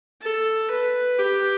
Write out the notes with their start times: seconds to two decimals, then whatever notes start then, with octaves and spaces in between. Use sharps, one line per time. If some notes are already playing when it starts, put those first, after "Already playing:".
0.21 A4
0.70 B4
1.19 G4